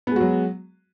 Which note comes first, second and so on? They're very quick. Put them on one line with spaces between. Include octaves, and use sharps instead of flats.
B3 G#3 F#4 F#3